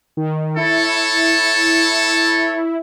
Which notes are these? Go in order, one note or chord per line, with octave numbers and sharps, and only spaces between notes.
D#3
E4 A4 C#5 A5